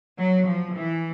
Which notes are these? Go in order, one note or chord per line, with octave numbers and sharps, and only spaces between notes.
F#3
F3
E3